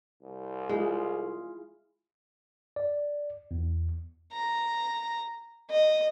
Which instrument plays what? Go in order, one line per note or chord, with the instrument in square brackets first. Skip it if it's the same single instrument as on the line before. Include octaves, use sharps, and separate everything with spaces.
[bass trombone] C2
[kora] G#3 [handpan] E4 F4 G#4
[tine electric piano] D5
E2
[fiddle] A#5
D#5